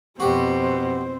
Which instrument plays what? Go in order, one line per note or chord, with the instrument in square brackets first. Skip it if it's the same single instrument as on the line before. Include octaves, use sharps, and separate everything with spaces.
[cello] F2 B2 [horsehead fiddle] C4 C5 [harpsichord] F#4 G4